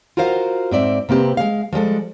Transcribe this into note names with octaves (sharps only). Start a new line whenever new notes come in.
F4 F#4 A#4 C5 F5
G#2 C4 D5 E5
C3 A#3 C4 G4 B4
G#3 F5
F3 G3 G#3 A4